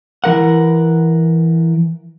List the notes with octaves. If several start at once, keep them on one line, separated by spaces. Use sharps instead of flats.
E3 A#4 F#5